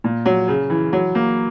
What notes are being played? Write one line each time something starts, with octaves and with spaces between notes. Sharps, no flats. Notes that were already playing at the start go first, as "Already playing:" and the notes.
A#2
F#3
C#3
E3
F#3
A#3